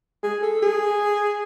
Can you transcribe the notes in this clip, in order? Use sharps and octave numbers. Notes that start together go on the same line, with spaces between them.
G#4
A4
G#4